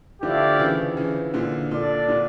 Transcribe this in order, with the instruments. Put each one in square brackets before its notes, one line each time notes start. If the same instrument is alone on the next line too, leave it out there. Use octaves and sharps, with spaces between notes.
[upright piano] D3 F3 [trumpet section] A3 E4 G4 D5 F5
[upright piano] C#3 E3
C#3 E3
A#2 D3
[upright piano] A#2 [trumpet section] D4 A4 D5
[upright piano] A#2 D3